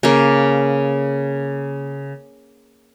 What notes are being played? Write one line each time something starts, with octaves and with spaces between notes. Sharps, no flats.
C#3 A#3